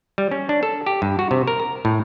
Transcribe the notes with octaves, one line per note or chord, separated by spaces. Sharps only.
G3
C#4
D4
A4
G4
G2
F#4
C3
A#4
A#5
A2